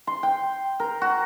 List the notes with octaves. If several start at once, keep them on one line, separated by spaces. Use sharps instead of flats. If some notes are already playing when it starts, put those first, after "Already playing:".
C6
G5
A#4
F#4